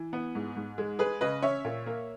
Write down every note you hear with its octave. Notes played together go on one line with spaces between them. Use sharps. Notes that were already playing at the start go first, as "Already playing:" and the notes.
Already playing: E3
B3
G#2
G#2
G#3
G#3 G#4 B4
C#3 B4 D#5
C#4 C#5 E5
A#2
A#3